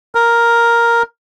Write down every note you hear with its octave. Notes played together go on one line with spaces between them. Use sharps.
A#4